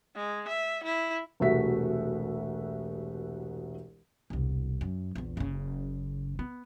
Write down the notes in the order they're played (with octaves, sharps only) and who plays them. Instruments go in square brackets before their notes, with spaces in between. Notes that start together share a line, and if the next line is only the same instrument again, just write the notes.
[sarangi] G#3
E5
E4
[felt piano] E1 C2 A3 F#4 E5 B6
[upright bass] E1 C2
F#2
A#1 E2
F#1 C#3
B3